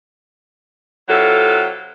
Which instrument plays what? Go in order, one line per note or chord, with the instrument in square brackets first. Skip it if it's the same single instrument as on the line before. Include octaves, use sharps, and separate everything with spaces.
[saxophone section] C3 F#3 E4 F4 A4